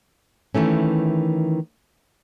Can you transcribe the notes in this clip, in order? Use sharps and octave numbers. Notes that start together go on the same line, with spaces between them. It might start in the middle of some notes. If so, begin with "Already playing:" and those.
D#3 E3 A3 C#4